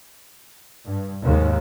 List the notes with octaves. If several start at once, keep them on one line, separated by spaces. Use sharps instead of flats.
G2
D#2 G#2